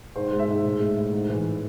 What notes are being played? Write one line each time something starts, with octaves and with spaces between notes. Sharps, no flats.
G#2 C5
G#3
E5
G#2
A2
G#3
A2
G#2
E3